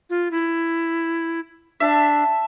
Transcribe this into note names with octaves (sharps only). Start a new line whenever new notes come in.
F4
E4
D4 E5 A5